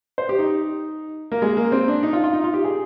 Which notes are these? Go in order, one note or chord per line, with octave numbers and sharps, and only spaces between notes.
C5
G4
D#4
A#3
G#3
A#3
C4
D4
D#4
F4
F4
D#4
F4
G4
G#4